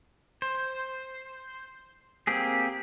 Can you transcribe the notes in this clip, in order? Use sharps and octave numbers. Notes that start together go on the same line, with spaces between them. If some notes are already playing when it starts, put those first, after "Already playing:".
C5
A#3 C4 G4 G#4